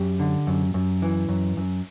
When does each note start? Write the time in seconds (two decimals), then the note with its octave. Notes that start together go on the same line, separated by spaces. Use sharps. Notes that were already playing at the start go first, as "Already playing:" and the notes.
Already playing: F#2 G4
0.20 D3
0.47 F#2
0.74 F#2
1.02 E3
1.29 F#2
1.57 F#2